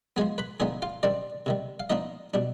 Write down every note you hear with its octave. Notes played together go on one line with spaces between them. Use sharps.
F3 G#3 B3 G#4 G#5
B4 B5
D3 F3 B3 D#4 G#4 G#5
F4 F5
D#3 G3 C4 D4 D5
C3 D#3 G3
F5
F3 B3 D4 D#4 D#5
B2 G3 D4